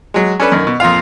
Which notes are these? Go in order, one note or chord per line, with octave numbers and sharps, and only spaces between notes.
F#3 G#3
C#4 D4 A4 B4
F#2 D#3
B2
F2 A#2 F4 F5